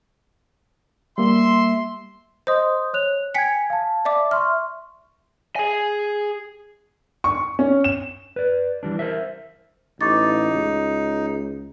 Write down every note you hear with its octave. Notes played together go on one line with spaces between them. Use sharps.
G3 A#3 E5 C6
C5 D#5 C6 D#6 G6
C#5 F#6 F7
G5 G#5 G#6 B6 C#7
F5 A5
D5 E5 D6
E5 C6 C#6 F6
G#4 G#5
C#6
C#4
E7
B4 D5
E3 G3 D4
A#4 C5 E5
A1 D#4 C#6 D6 A6
C#2